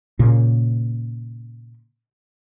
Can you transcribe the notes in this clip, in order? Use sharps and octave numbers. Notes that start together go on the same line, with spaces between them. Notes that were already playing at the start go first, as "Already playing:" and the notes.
A#2 C#3 A#3